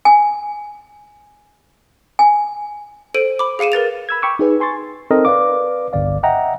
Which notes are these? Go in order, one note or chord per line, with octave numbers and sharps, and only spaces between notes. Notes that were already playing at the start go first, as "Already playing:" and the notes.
G#5
G#5
A4 C5 D7 D#7
B5 D6
G#4 F5 C#7 D#7 E7
A#4 B4 A6 F7
B5 E6 G#6
G5 B5 C#6 D6 E6
D#4 G#4 B4
G#5 C6 C#6 A6
C4 D#4 A4 A#4 D#5
B4 D5 F5 D6
G1 C2 D5 F5
D#5 E5 F#5 G5 A#5